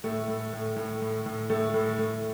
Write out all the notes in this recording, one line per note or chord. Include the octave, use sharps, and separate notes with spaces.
A2 A3
A2
A2
A2
A2
A2
A2 A3
A2
A2